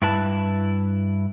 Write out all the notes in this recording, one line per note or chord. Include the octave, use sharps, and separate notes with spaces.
G2 E4 B4 A5